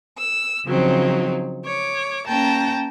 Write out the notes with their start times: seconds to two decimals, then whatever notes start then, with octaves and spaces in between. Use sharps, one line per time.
0.18 E6
0.66 C#3 F3 F#3 C4 D#4
1.65 C#5 D6
2.27 A#3 C#4 G5 A5 A#5